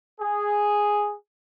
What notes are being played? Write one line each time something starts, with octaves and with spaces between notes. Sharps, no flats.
G#4